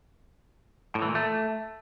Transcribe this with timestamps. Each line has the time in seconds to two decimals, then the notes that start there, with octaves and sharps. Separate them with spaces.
0.95 A2
1.02 E3
1.08 A#2
1.15 A3